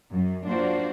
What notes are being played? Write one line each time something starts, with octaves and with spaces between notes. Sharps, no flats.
F#2 F#3
A#3 D4 F4 F#4 C5